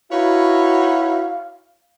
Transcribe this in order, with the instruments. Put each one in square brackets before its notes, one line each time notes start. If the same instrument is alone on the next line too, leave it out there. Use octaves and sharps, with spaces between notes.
[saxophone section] D#4 B4 C#5 [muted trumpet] E4 [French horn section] F#4 [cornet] F5